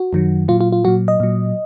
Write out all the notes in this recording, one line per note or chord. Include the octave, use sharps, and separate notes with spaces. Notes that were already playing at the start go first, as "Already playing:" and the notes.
Already playing: F#4
F#2 D#3 F#3
A#2 F#3 F4
F4
F4
A#2 F#3 F#4
D#5
A#2 F#3